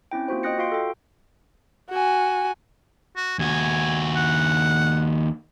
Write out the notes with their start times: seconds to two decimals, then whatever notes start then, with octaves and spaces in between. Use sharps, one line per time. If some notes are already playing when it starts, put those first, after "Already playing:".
0.11 C4 C#4 E4 G5
0.28 A#3 F4 F#4 C5
0.43 D#5 G5 D#6 F#6 A#6 C#7
0.58 F4 F#4 F5 C6 D7
0.72 A4 G5
1.90 F#4 G#5
3.16 F#4
3.39 D#2 F#4 G#5
4.17 F#5